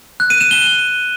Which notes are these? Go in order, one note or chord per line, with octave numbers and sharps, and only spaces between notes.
F#6
D#7
E7
G7